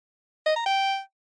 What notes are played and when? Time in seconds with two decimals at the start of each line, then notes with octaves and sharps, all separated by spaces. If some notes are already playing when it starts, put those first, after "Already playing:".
0.46 D#5
0.56 A#5
0.66 G5